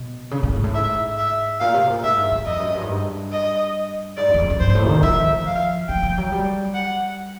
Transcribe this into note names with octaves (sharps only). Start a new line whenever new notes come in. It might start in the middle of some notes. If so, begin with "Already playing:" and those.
Already playing: B2
C#3
A2
G#2
A2
G#2 E5
E5
A#2 F5
C3
A#2
G#2 E5
G2
G2
F2 D#5
F#2
G2
G#2
G2
D#5
G#2 D5
F#2
E2
F2
F2
G2 C5
A2
D#3
F3 E5
F5
F3 G5
F3
F#3
G3
F#5